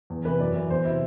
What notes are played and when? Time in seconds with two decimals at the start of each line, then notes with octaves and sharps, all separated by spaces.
0.10 E2
0.25 C3 E3 B4
0.40 F#2 D5
0.55 E3
0.70 E2 C5
0.85 C3 F#3 E4